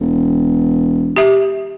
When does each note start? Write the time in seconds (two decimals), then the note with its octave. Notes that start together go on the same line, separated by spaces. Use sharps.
0.01 E1
1.16 G4 E5